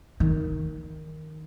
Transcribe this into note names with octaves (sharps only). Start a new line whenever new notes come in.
D#3